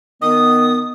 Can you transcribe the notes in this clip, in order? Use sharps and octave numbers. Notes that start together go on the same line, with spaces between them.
D#3 B3 D#6